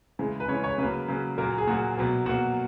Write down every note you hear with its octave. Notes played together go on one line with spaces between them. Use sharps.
C#3 E3 G#3
B4
C#3 E3 G#3 C#5
C#5
C#3 F#3 A#3 B4
C#3 F#3 A#3
A#2 F#3 A#3 A#4
G#4
A#2 F#3 A#3 F#4
B2 F#3 A#3
B2 F#3 A#3 F#4